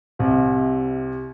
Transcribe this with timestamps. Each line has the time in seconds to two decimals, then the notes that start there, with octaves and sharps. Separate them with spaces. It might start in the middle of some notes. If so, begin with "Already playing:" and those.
0.19 C2 C3